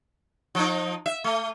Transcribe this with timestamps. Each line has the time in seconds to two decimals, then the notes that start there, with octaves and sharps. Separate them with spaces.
0.55 F3 D#4
1.06 E5
1.24 A3